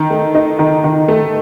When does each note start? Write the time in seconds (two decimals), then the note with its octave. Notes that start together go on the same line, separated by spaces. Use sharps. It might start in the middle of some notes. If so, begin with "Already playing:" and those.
Already playing: D#3
0.10 A3
0.35 D#4
0.59 D#3
0.84 D#3
1.08 A3